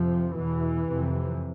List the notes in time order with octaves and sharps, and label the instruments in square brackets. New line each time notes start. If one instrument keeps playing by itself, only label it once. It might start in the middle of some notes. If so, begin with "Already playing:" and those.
Already playing: [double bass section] F2 C3 F3
E2 B2 E3
F2 C3